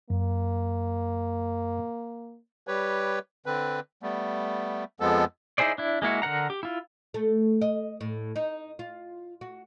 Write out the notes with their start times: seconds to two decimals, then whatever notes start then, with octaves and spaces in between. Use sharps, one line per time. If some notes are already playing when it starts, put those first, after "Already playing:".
0.10 F#2 A#3
2.67 G3 G4 B4 C#5
3.46 D3 C4 B4
4.03 G3 A3 B3
5.00 F2 F3 G#3 B3 A4
5.58 D#4 E4 G#4 C5 D5
5.78 D4 E4
6.02 G#3 A#3 E4 F#4
6.22 D3 A#4 F#5 A#5
6.50 G4
6.63 E4 F4
7.14 A3
7.62 D#5
8.01 A2
8.36 D#4
8.79 F4
9.41 F#4